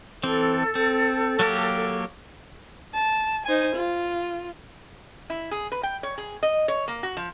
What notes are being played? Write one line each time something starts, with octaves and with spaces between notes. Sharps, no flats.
E3 C4 A4
C4
F#3 A#3 G4
A5
D#4 C5 G#5
F4
E4
G#4
B4
G5
C#5
G#4
D#5
C#5
A#3
F#4
F3